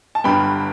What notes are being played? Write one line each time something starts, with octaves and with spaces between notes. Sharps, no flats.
A5
G1 G2 G3 B3 G5 B5